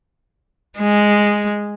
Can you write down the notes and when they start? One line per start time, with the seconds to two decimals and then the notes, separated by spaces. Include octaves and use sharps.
0.79 G#3